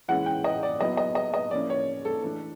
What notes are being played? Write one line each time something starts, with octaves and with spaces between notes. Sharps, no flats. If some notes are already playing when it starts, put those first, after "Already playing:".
E3 G#3 C#4 E4 F#5
G5
D#5
D5
F#3 B3 E4 D#5
D#5
D#5
D#5
F3 A#3 C#4 E4 D5
C#5
A4
E3 A3 D4 A4